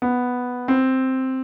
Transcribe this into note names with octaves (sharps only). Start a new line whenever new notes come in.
B3
C4